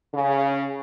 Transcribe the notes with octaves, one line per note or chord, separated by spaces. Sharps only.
C#3